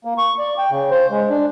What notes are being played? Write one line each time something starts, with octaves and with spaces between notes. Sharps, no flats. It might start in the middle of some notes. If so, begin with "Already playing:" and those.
A#3
C#6
D5
G5
C#3
C5
G#3
D4